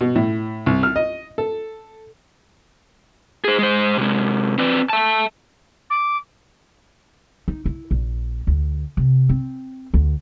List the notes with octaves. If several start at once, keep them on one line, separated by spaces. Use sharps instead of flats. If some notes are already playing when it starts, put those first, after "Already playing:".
B2
A2
C2
F6
D#5
A4
G#4 C5
G#3 C5
C3 G#3
C4 B4 D5
E5 A5
D6
D#4
E4
A#1
D2
C3
C4
D2